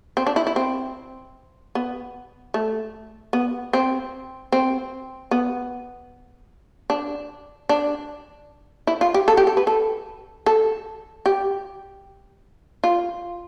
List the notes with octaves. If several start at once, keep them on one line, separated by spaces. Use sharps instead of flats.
C4
D4
E4
E4
C4
B3
A3
B3
C4
C4
B3
D4
D4
E4
F4
G4
A4
G4
A4
B4
A4
A4
G4
F4